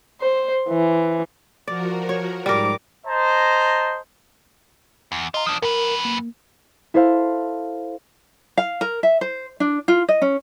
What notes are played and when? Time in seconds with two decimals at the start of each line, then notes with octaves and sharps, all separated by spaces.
0.21 C5
0.69 E3
1.67 F3 F#4 A#4 D5
2.09 C#5
2.46 G#2 G3 A#4 D6
3.06 C5 D#5 A5 A#5
5.12 E2
5.34 F4 D#5 A#5
5.46 F3 D4 D#6
5.62 F#2 A#4 B4
6.05 A#3
6.94 E4 A4 C5 F5
8.57 F5
8.81 A#4
9.03 E5
9.21 C5
9.60 D4
9.88 F4
10.09 D#5
10.22 C#4